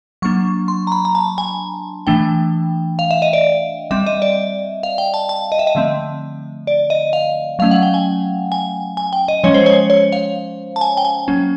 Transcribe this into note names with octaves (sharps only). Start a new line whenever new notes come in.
F#3 A#3 D4 C#6
C6
A#5
B5
A#5
A5
G#5
E3 A3 D4 G5
F5
E5
D#5
D5
G3 C4 E5
D#5
D5
F5
G5
A5
A5
D#5
E5
D#5
D3 F3 A3 C4
D5
D#5
F5
F#3 A3 C#4 F5
F#5
G5
G#5
G#5
G#5
G5
D#5
F3 G#3 C#4 C#5
C5
C#5
C#5
F5
A5
G#5
G5
G#5
F#3 A#3 C#4